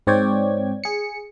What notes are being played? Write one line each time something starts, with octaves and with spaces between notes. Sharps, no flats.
G#2 C4 C#5 D5 G5 G#6
G#4 C#7